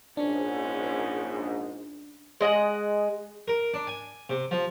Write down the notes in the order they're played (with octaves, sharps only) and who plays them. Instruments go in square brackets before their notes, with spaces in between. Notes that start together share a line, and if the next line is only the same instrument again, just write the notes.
[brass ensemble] A#1 G#2 [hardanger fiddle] C#4 [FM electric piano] D4
[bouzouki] G#3 D#5 F5 F#5
[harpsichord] A#4
D4
G#5
C3
F3